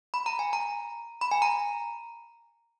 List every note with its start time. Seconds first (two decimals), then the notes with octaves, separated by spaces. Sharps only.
0.14 B5
0.26 A#5
0.39 G#5
0.53 A#5
1.21 B5
1.31 G#5
1.42 A#5